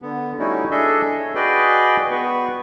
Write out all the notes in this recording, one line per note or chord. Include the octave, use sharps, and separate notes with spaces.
D3 B3
G3 A3 C#4 D#4 E4 F#4
D4 G#4 A4 D#5 E5
C#5
F#4 G#4 B4 D5 D#5 G5
B3 F#4 B4 C#6